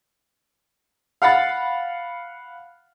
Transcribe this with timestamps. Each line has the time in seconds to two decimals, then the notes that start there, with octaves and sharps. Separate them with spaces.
1.22 F5 F#5 B5 A6